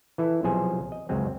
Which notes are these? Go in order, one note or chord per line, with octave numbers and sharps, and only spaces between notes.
E3 E4 A4
B1 C3 F3 G#4 C5 G#5
D#5
C#2 F#2 G#3 C4